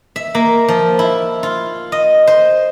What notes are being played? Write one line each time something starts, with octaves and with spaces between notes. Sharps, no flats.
E5
A#3
F3
E4
F4
D#5
C5